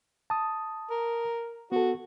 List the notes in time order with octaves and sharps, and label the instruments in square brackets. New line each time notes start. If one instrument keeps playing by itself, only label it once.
[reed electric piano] A5 D#6
[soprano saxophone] A#4
[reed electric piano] B3 A4 [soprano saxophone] F#4